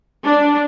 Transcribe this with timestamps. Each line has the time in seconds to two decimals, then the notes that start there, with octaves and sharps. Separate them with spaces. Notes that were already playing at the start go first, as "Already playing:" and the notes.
0.24 D4